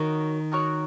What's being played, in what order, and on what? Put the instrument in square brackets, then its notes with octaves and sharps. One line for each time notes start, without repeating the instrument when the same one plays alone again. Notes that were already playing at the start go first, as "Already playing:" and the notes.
Already playing: [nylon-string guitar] D#3 [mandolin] D#4 F#4 A#4 C#5
[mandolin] D#4 F#4 A#4 C#5